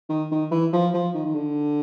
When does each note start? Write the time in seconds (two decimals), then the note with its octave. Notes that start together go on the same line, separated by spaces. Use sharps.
0.10 D#3
0.31 D#3
0.51 E3
0.73 F3
0.94 F3
1.15 D#3
1.25 D#3
1.35 D3